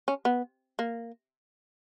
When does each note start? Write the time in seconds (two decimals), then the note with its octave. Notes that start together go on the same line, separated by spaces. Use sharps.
0.08 C#4
0.25 B3
0.79 A#3